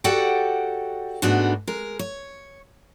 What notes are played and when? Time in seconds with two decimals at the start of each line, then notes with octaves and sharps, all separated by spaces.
0.04 F#4 G4 A4 D5 F#5 G5
1.22 G#2 A3 B3 D4 D#4 F#4
1.67 G#3 A#4
1.99 C#5